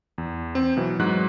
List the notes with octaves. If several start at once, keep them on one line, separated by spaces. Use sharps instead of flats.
E2
C4
B2 E3 F#3
G#2 F#3 F#6